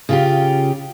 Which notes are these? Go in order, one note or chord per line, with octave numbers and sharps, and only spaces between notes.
C#3 F4 G4